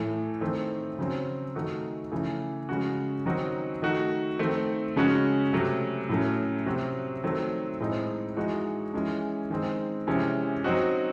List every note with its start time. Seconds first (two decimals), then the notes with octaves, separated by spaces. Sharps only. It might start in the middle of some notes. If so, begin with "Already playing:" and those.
Already playing: A2 E3 A3
0.41 D#3 A3 C4
0.98 C#3 F#3 C4
1.55 D#3 A3 D#4 F#4
2.12 C#3 E3 A3
2.69 C#3 G#3 C#4 F#4
3.26 D#3 F#3 C4 D#4 F#4
3.82 D#3 A3 D#4 F#4
4.39 D#3 A3 C4
4.96 C#3 G#3 C#4 F#4
5.53 C3 F#3 A3
6.09 A2 F#3 A3 C#4
6.66 C3 F#3 C4 F#4
7.23 D#3 F#3 A3 C4
7.80 A2 G#3 C4 D#4
8.37 E3 G#3 D#4 F#4
8.94 E3 G#3 C#4
9.50 D#3 G#3 C4
10.07 C3 E3 G#3 C#4
10.64 F#3 C4 D#4 F#4